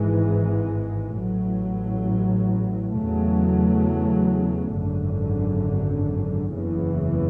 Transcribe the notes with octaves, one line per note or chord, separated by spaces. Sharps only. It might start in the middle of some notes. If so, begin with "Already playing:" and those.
Already playing: G#1 G#2 E3 G#3
A1 A2 F#3
E2 C#3 F#3 A3
G#1 F#2 D3
F#1 E2 C#3 E3